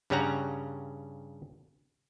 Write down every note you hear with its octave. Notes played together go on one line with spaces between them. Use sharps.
G2 C#3 G3 C#4 F#5 A#5